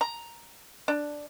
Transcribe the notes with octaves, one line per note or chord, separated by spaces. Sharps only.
A#5
D4